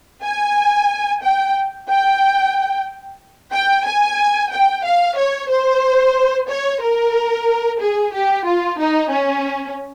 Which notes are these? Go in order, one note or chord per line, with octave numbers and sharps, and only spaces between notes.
G#5
G5
G5
G5
G#5
G5
F5
C#5
C5
C#5
A#4
G#4
G4
F4
D#4
C#4